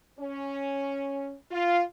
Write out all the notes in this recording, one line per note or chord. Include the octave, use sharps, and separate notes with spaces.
C#4
F4